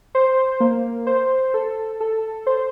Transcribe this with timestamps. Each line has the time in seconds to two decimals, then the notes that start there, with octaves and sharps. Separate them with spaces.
0.15 C5
0.60 A#3
1.07 C5
1.54 A4
2.00 A4
2.47 C5